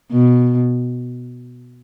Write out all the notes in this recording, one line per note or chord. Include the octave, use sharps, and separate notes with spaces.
B2